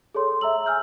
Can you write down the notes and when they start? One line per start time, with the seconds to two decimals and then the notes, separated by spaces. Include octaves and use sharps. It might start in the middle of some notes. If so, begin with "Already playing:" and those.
0.15 G#4 A4 C#5 C6
0.41 E5 A#5 E6 F#7
0.66 G#5 E6 F6 G6